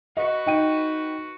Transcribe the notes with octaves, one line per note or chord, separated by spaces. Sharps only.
F#4 B4 D#5
D#4 G5 D#7